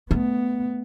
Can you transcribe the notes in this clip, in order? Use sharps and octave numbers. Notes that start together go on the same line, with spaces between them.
A3 B3